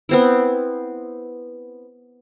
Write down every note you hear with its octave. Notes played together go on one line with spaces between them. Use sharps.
B3 C4 E4